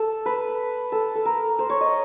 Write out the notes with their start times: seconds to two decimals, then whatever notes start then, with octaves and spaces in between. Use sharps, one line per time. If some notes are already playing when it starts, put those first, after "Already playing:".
Already playing: A4
0.26 B4
0.92 A4
1.15 A4
1.25 A#4
1.59 C5
1.70 C#5
1.81 D#5